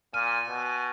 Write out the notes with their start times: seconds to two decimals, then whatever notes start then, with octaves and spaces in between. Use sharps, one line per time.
0.14 A#2 G#5 F6
0.49 B2